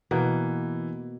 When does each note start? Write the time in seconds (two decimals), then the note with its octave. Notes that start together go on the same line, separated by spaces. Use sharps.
0.11 B2 E3 A#3